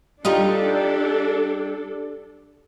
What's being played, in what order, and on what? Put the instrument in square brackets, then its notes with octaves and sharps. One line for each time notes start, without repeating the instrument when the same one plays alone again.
[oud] G3 D#4 F4 [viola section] D4 A4